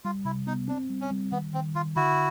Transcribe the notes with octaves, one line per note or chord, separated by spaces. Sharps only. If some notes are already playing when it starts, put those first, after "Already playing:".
G3 F4
C3 E4
B3 D#4
C4 D4
G3
C#4
G3
D#3 B3
D#3 C4
D#3 F4
D3 E4 F#4